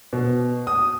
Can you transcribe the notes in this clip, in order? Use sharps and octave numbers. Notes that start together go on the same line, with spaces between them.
B2
D#6